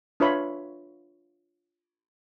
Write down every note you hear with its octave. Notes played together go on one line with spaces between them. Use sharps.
D4 F4 B4 C#5 E5 B5